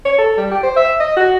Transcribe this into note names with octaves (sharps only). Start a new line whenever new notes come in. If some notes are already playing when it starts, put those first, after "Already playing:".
C#5
A4
G3
G4
C5
E5
D#5
F#4